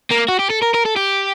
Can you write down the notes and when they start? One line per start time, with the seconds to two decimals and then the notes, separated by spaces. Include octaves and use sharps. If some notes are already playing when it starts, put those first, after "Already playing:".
0.11 A#3
0.29 F#4
0.39 G4
0.50 A4
0.63 A#4
0.74 A#4
0.86 A4
0.97 G4